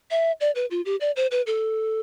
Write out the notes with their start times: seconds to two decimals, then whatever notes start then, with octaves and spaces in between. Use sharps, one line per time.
0.11 E5
0.41 D5
0.55 B4
0.71 F4
0.85 G4
1.01 D5
1.16 C5
1.31 B4
1.47 A4